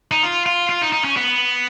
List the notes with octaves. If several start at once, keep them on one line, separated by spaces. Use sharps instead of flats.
D#4
F4
F4
F4
D#4
D#4
C#4
B3